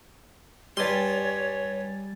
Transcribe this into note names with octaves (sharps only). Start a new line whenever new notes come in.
G2 G3 C#5 G#5 C6 A6